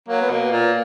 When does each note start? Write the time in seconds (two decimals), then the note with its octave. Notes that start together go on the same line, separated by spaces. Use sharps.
0.08 F#3 A#3
0.22 B3
0.30 B2 A#3
0.52 A#2